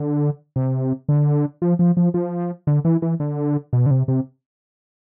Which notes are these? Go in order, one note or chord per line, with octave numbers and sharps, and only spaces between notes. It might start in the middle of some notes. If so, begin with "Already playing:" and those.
Already playing: D3
C3
D3
F3
F3
F3
F3
D3
E3
E3
D3
B2
D3
C3
C3